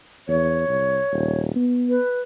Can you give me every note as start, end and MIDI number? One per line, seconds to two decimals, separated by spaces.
0.28 0.64 40
0.28 1.40 73
0.68 1.00 36
1.13 1.52 27
1.56 1.98 59
1.89 2.21 71